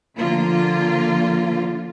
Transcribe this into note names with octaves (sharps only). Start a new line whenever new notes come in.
D3 F3 A#3 F4